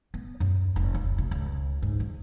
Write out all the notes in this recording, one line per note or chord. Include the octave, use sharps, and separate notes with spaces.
B3
F#2
F1
D2
C3
C#2
G#2
E2